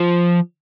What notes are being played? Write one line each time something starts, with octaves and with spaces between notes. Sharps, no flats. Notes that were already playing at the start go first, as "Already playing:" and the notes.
Already playing: F3